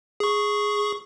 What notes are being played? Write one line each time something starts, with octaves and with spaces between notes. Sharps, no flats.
G#4 C#6